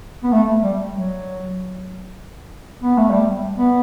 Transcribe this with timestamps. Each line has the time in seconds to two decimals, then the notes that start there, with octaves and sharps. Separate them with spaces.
0.24 B3
0.32 A3
0.63 G3
0.95 F#3
2.83 B3
2.98 A3
3.10 G3
3.58 B3